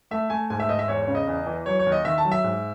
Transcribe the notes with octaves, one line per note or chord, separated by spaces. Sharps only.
A3 E5
A3 G#5
G#2 G#5
E5
G#2 D#5
E5
E2 C#5
C#5
C#3
D#5
E2
E3
F#3 C#5
C#5
D#2
D#5
D#3 E5
A5
F#3
E5
G#2